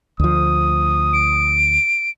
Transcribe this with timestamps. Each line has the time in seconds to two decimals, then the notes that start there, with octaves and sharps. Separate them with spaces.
0.20 D2 F3 D#6
1.13 D7